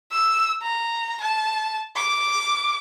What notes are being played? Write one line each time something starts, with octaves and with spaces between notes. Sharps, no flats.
E6
A#5
A5
D6